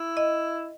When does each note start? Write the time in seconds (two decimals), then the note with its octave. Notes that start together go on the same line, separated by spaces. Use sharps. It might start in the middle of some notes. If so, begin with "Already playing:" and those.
Already playing: E4
0.17 D#5